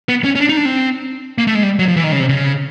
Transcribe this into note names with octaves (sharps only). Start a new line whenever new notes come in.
B3
C#4
C#4
D4
D#4
D4
C4
A#3
A3
G#3
G3
F#3
F3
E3
D#3
C#3
C3
C#3